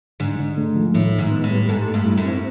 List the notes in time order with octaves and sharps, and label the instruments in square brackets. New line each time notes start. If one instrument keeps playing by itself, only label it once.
[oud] G#2 [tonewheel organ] D3
[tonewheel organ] D3
A3
F3
[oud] A2 [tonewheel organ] D#3
[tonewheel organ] D#3
[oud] G#2
[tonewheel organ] B3
[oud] A2
[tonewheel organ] G3
[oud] G#2 [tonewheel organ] A4
[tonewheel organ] A3
[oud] G2
[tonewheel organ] E4
[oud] F#2
[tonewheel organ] C4